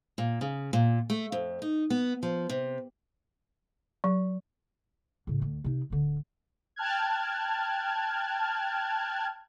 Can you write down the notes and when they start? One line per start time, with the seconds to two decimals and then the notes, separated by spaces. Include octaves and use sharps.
0.18 A#2
0.41 C#3
0.73 A#2
1.10 A3
1.32 F2
1.62 D#4
1.90 B3
2.23 F3
2.49 C3
4.04 F#3
5.27 A2 C#3
5.42 D2
5.64 C3 D#4
5.90 D1 D3
6.76 G5 A5 F6 F#6 G#6